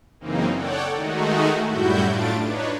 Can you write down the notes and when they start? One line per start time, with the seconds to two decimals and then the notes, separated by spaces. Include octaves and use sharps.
0.20 F#2 C#3 E3 A#3 C4 D#4
0.54 A4 C#5 D5 F#5 G5
0.94 D#3 G#3 A3 D#4 F#4
1.67 F#2 A2 G3 E4 F#4 G6
2.06 A2 A3 D4 F4 A6 D7
2.43 D4 D#4 B4 C#5